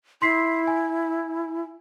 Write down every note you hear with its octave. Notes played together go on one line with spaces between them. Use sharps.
E4 C6 B6 C7
G#5